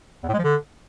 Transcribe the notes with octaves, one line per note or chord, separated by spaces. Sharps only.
E2
A2
G#3
F3
D3